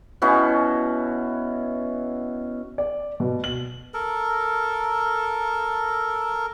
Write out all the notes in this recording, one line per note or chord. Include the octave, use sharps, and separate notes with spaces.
B2 C#4 E4 F#4
D5
B2
F#7
A4 A#4